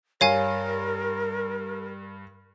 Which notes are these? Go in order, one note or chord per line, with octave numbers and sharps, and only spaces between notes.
G2 A#4 C#5 F5 G#5